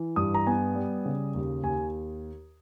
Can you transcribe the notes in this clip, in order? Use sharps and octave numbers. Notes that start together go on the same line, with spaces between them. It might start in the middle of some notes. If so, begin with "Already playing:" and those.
Already playing: E3
G2 D#6
A#5
B3 G#5
G3
C#3
D#2
D#2 G#5